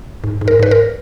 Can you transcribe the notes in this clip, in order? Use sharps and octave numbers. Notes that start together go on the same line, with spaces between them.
G#2
G#2
A#4
G#2 B4
A#4